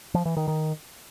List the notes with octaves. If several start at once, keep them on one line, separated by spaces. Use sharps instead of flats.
F3
E3
D#3
D#3